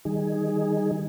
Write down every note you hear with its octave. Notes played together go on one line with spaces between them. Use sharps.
D#3 G3 D#4 G#4